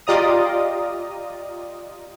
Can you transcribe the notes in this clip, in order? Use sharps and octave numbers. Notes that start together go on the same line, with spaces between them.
F4 G4 D5 D#5 A#5 D#6